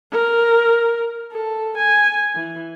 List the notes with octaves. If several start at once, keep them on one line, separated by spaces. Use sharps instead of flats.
A#4
A4
G#5
E3